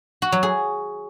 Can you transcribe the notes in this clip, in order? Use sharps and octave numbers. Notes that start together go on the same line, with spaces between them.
F#4
F#3
G#4